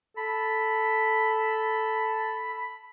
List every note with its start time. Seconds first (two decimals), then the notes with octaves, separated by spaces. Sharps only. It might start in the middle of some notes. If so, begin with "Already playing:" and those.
0.17 A4 B5